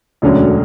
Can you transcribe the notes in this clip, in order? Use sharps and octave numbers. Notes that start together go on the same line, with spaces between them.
E1 D2 D3 F#3 C#4